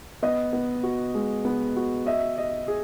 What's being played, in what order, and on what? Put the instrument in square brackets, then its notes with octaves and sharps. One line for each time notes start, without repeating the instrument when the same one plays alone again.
[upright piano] B3 [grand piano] D#5
[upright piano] B3
F#4
G#3
B3
F#4
[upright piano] D#5 [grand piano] E5
[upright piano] D#5
G#4